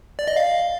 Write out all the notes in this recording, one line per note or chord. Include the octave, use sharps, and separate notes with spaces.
D5
D#5
F5